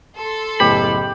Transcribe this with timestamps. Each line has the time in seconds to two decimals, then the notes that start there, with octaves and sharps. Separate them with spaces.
0.18 A4 C6
0.60 F#1 A2 B3 G4 B5